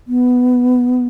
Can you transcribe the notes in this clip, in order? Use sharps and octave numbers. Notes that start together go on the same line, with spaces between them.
B3